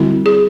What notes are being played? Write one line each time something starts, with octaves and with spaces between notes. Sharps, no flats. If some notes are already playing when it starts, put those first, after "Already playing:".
Already playing: D3 G3 C4 E4 F#4
G#4